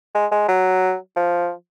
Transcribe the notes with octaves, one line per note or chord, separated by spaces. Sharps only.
G#3
G#3
F#3
F3